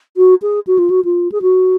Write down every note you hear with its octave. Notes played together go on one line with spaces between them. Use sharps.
F#4
G#4
F#4
F4
F#4
F4
G#4
F#4